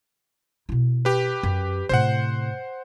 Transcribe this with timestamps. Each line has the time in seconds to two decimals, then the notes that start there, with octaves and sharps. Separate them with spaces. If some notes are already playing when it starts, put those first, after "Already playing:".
0.69 B2 E4
1.05 G4 B4
1.43 F#2
1.89 A2 C3 C5 F#5